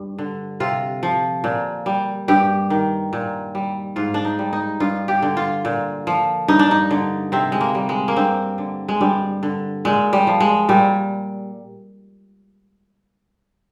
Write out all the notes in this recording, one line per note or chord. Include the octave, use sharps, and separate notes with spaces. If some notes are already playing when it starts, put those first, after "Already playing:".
Already playing: G2
D3
C3 F4
F3
A#2
G3
G2 G4
D#3
A#2
G3
G#2 F4
D4
D#4
G3
D#4
G2 F4
G4
D3
F4
A#2
F3
G2 D#4
D4
D#4
D3
C3 C4
G#3
A#3
G3
G#3
A#3
G2 C4
D3
G#3
G2 G3
D3
A#2 G#3
G3
F3
G#3
A#2 G3